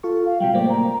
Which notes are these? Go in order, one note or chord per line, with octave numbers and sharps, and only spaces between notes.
F4 A4 C#6
F5
C3 F#3 G3 G5
A2 A#3 C5 D5
A#5